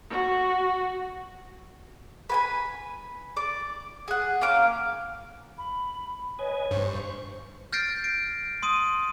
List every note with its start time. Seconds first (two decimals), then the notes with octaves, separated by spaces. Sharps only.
0.10 F#4
2.29 B4 G#5 B5
3.36 D5 D6
4.08 G#4 F#5
4.41 A#3 C#4 F5 D6
5.58 B5
6.39 B4 C#5 D#5 G#5
6.71 G2 C5 C#6
7.73 F6 G6 A6 A#6 C7 D7
8.04 D7
8.63 C6 D#6 D#7